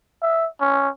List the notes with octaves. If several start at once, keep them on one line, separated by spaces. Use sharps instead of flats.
E5
C#4